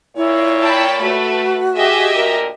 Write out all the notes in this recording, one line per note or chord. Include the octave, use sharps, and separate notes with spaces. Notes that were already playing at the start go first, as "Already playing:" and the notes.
A#2 E4 C#5
G5 A5 B5
A3 F#4 B4
G4 G#4 D#5 E5
D2 A#2 A#4